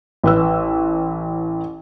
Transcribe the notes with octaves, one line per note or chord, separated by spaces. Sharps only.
A1 B4 E6